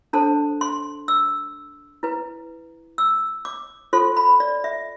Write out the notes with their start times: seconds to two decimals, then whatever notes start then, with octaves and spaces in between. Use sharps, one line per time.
0.13 D4 A4 C5 A5
0.61 C6
1.08 E6
2.03 E4 B4
2.98 E6
3.45 D6
3.93 F4 A4 C5 C6
4.17 B5
4.40 D5
4.64 E5